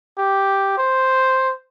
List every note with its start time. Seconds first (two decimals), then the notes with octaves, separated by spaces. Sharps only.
0.18 G4
0.77 C5